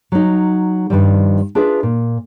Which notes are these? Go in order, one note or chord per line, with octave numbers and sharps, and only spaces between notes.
F#3 D#4
G2 D#3 F3 G3
D4 F4 G#4 B4 E5
A#2